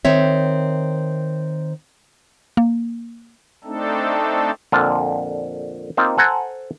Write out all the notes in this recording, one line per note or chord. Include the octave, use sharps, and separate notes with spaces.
D#3 C4 C#5 E5
A#3
A3 C4 D4 D#4 A4
F2 A#2 D3 F4
A#3 C4 D#4 F4
A4 C5 F#5 G#5 A#5